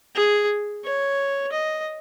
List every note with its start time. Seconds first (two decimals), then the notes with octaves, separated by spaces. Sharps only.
0.15 G#4
0.84 C#5
1.52 D#5